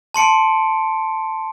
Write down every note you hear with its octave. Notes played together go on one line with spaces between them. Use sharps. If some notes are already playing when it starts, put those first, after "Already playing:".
A5 C6 C#7 D7